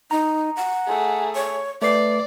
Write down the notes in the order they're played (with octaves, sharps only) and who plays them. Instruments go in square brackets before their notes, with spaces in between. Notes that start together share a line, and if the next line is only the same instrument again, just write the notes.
[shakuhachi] D#4 [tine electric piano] A#5
[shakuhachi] F#5
[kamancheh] A3 G#4
[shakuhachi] C#5
[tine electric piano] A3 B4 C7 [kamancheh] D5 [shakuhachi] D6